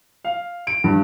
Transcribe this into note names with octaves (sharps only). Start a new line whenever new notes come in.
F5
D7
G2